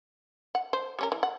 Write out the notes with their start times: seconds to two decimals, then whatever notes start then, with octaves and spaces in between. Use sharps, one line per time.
0.55 F#5
0.73 C5
0.99 G3 C#4 A#4
1.12 E3
1.23 F#5